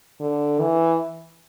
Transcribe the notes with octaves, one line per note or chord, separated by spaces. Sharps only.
D3
E3